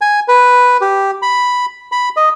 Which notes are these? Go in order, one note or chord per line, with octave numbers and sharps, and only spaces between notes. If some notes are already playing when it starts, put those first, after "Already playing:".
G#5
B4
G4
B5
B5
D#5